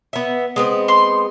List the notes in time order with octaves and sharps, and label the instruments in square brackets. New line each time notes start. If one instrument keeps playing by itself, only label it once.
[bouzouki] B3 E5
G#3 B3 C4
[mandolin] C6